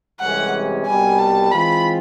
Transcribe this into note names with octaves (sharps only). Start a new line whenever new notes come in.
C2 C3 E3 G#3 C#4 F#5
C2 B2 G3 G#5
A5
E3 G#3 C4 F4 B5